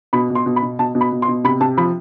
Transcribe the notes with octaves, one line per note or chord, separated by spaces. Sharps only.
B2 B5
B2
C6
B2
B5
B2
B2 A5
B2
B5
B2
C6
B2
C3 B5
C3 A5
F3 B5